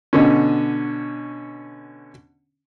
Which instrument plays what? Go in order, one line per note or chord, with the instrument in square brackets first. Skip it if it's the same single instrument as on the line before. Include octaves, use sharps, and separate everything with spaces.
[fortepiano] B2 D3 C#4